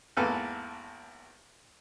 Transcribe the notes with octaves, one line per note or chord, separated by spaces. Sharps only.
G#1 E2 A#3 A4 B4 F6